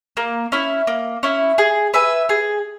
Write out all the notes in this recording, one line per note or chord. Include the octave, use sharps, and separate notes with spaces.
A#3
C#4 E4
A#3
C#4 E4
G#4
B4 E5 G#5
G#4